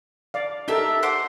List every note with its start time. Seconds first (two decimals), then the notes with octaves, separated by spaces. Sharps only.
0.34 D5 F5
0.68 D4 D#4 G4 A4 A#4 E5
1.03 C5 F#5 D6